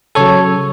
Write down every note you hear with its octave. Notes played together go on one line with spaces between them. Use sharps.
C#3 F#3 A4 C#5